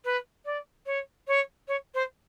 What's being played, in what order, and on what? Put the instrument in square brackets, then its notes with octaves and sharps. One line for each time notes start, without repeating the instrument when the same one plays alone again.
[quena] B4
D5
C#5
C#5
C#5
C5